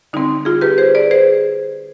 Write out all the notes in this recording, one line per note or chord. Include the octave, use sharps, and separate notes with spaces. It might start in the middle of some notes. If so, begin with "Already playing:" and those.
D3 G3 C4 D#4
F4 G#4
G4 B4
G#4 C5
B4 D5
G#4 C5